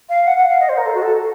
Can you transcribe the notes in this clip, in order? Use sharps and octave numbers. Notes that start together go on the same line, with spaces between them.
F5
F#5
F#5
F5
D#5
C5
A#4
A4
F#4
A4